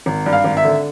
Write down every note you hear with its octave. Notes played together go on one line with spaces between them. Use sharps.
G#1
G2
F5
G#1
E5
D3